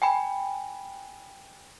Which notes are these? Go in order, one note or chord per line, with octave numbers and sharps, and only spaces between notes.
G5 G#5 B5